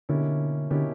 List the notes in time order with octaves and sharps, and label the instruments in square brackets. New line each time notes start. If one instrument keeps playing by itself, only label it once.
[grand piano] B2 A#3 C#4 E4 G4 [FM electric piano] D3
[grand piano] B2 A#3 C#4 E4 G4 [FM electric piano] D3